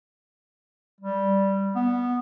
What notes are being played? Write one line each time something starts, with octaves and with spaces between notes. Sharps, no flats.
G3
B3